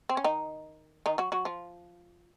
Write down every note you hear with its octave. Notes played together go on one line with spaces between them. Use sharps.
C4
C#4
D#3 D#4
D#3 D#4
F#3 F#4
F#3 F#4
F3 F4